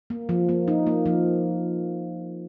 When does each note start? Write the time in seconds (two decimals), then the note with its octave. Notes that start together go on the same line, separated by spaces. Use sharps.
0.10 A#3
0.29 F3
0.49 A#3
0.68 D#4
0.87 A#3
1.06 F3